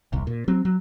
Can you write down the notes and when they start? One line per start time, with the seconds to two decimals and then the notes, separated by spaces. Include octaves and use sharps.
0.13 D#1 C2
0.27 A#2
0.48 F#3 C4
0.65 F#3